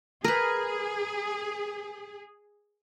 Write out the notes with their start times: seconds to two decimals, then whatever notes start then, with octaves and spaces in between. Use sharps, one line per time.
0.24 G#4 A#4 B4